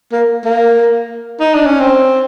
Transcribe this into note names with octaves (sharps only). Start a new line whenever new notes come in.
A#3
A#3
D#4
D4
C#4
C4